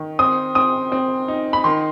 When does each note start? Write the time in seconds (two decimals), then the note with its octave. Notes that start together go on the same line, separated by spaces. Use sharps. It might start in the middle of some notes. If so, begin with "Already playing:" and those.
Already playing: D#3
0.19 C4 D#6
0.55 C4 D#6
0.92 C4
1.28 D#4
1.53 B5
1.64 D#3 C6